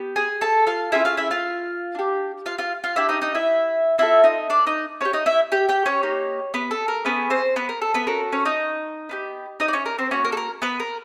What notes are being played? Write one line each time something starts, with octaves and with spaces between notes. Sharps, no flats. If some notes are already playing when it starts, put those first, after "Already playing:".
Already playing: B3 G4
G#4 G#5
A4 A5
F4 F5
C#4 E4 F4 G#4 E5
F4 F5
E4 E5
F4 F5
D4 G4
F4 F5
F4 F5
F4 F5
D4 E4 G4 E5
D#4 D#5
D#4 D#5
E4 E5
C4 E4 F4 A4 E5
D#4 D#5
D4 D5
D#4 D#5
C#4 D4 G4 C#5
D#4 D#5
E4 E5
G4 G5
G4 G5
C#4 C#5
A#3 D#4 G4
B3 B4
A4
A#4
B3 C#4 G#4 B4
C4 C5
B3 B4
A#4
A4
B3 B4
C#4 F#4 A4 A#4
C#4 C#5
D#4 D#5
B3 D4 G4
D#4 D#5
D5
C#4 C#5
A#4
C4 C5
A#3 C#4 F#4 C#5
A#4
A4
A#4
B3 B4
A#4